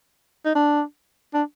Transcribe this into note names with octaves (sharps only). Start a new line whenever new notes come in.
D#4
D4
D4